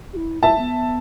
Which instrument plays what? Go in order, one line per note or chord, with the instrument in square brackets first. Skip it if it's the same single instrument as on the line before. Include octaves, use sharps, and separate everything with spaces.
[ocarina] G4
E4
[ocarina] E4 [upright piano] E5 A5
[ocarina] B3